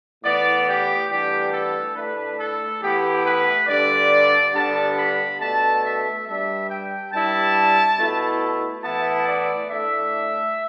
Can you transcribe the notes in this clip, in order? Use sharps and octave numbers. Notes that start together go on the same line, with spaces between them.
A2 E3 B3 D5
G4
A2 E3 G3 B3 D4 G4
A4
A2 A3 D4 B4
A4
A2 E3 B3 E4 G4
B4
G2 D3 G3 D5
G2 D3 G3 B3 D4 A5
B5
B2 A3 D4 A5
E5
G2 G3 D4 E5
G5
G2 G3 E4 A5
B2 A3 E4
A2 E3 B3 E4 A5
D5
A2 A3 D4 E5